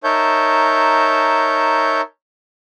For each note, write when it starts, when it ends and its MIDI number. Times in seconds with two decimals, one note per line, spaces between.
0.04 2.01 63
0.04 2.01 70
0.04 2.01 73
0.04 2.01 76
0.04 2.01 81
0.04 2.01 91